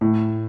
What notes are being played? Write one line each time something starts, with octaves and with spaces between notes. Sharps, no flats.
A2